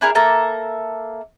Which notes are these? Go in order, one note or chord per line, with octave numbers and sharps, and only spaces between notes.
D4 E4 G#4 A#4
A#3 A4 E5 A#5